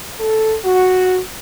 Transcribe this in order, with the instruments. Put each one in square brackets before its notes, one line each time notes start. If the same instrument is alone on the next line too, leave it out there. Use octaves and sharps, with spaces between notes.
[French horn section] A4
F#4